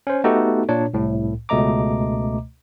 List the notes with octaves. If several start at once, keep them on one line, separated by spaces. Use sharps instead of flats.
C#4 C5
A3 B3 D#4 F#4 G4 A4
A#2 D4 C#5
C2 A2
C#2 B2 A3 D#5 A#5 D6